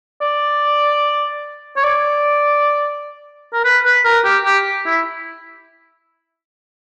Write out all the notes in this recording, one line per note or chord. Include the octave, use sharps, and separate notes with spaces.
D5
C#5
D5
A#4
B4
B4
A#4
G4
G4
E4